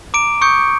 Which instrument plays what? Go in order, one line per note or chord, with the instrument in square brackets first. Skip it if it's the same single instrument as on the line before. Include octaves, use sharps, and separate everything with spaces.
[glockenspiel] A#5 D6 D7
C#6 D#6 G6 C#7